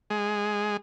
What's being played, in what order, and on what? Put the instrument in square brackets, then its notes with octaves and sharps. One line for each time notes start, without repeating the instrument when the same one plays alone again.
[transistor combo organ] G#3